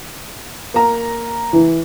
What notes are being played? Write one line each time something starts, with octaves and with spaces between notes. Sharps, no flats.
A#3 A#5
E3